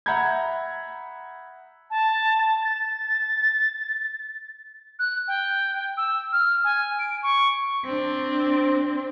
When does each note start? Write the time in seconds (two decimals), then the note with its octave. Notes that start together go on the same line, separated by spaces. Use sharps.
0.06 E5 F#5 A#5 B5 G6 G#6
1.90 A5
2.63 A6
4.99 F#6
5.28 G5
5.97 E6
6.33 F6
6.64 G#5
6.99 D7
7.23 C#6
7.85 C4 D4